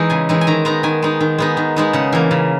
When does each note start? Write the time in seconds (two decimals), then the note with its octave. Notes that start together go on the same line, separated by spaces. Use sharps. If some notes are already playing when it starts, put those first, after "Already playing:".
Already playing: E3 G#3 D#4
0.10 C#3 G#5
0.29 E3 G#3 D#4
0.41 G#5
0.47 D#3 A#5
0.65 G#3 B3 D#4 A#5
0.83 D#3 G#5
1.02 G#3 B3 D#4
1.20 D#3
1.38 G#3 B3 D#4
1.57 D#3
1.76 G#3 B3 D#4
1.93 C#3 F#5
2.12 E3 A#3
2.31 C#3